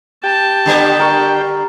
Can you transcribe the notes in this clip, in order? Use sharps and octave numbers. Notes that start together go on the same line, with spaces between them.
G4 G5 A5
D3 G3 B3
A#4 C#6